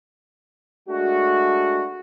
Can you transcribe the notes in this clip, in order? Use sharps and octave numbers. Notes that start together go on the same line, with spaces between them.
G#3 A3 D4 F#4